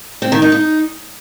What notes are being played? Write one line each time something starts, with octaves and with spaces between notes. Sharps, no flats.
C4
D#3
D#4
D#4